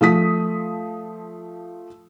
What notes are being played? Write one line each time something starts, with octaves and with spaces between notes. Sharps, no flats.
F3 A3 D#6 B6